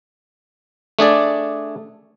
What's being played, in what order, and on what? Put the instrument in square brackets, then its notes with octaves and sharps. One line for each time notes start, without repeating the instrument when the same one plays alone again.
[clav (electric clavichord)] A3 D4 G#4 D5